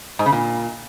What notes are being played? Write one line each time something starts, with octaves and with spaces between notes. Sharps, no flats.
G#2
C#3
A#2